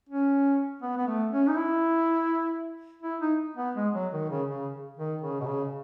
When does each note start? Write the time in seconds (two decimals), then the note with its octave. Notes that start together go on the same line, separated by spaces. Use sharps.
0.09 C#4
0.82 B3
0.97 B3
1.07 A3
1.31 C#4
1.47 D#4
1.56 E4
3.02 E4
3.20 D#4
3.57 B3
3.75 G#3
3.94 F#3
4.12 D#3
4.30 C#3
4.49 C#3
4.97 D#3
5.22 C#3
5.40 B2
5.46 C#3